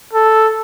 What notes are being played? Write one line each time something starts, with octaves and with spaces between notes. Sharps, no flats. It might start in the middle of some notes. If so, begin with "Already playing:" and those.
A4